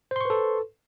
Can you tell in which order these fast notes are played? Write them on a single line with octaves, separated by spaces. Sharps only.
C5 C6 C#6 B4 A4